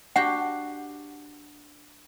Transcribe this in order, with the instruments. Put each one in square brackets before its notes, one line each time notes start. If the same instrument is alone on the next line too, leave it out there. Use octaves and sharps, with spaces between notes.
[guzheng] D4 F#4 G4 [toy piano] F#5